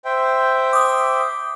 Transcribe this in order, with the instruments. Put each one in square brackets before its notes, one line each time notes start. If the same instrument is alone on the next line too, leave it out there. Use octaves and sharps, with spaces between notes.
[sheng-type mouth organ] C5 E5 G5
[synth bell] D6 D#6